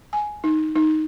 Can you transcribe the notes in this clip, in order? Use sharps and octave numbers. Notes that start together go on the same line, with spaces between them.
G#5
D#4
D#4